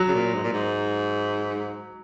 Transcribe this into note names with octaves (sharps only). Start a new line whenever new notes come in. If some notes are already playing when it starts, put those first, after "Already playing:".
Already playing: F#3
C#3
A#2
G#2
A#2
G#2